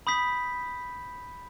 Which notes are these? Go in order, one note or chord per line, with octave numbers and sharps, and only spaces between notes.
B5 D#6 G6 B6